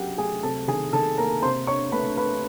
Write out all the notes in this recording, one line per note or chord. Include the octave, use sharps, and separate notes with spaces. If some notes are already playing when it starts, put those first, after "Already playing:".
Already playing: F#3 C#4 G4 G#4 F#5 G5
A3 G#4 G#5
C3 A4 A5
D#3 G#4 G#5
D#3 A4 A5
A#3 A#4 A#5
C3 C5 C6
D4 C#5 C#6
A3 B4 B5
D4 B4 B5